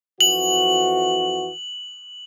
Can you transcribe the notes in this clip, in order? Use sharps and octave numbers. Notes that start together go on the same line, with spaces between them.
F2 E3 F#4 F#7